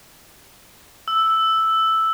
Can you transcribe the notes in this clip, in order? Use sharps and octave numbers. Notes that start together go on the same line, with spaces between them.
E6